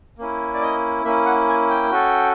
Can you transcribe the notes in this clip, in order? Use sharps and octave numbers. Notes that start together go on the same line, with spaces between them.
A#3 C#4 E4
D5
D#5
A#3 C#4 E4 E5
F#5
G#5
G5
C#4 F#4 A4